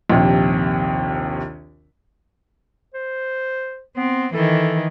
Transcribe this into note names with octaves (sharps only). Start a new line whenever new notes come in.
A#1 D#2 C3
C5
B3 C4
D#3 E3 A4